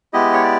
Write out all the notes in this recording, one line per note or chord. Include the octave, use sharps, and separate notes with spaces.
G#3 B3 E4 G4 D#5
C#5
D5